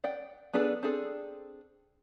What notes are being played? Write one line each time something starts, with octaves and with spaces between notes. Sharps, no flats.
D5 F#5 G5
B3 D4 G#4 A4 B4
C4 D4 G#4 A4